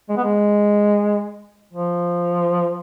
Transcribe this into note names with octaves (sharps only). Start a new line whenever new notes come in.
G#3
B3
G#3
F3